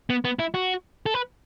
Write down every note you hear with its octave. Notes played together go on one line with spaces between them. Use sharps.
B3
B3
E4
F#4
A4
B4